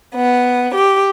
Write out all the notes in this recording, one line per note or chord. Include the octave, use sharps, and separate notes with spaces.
B3
G4